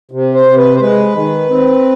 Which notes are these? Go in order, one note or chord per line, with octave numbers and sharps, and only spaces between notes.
C3
C5
C3
B4
C5
G#3 B4
D#3
C4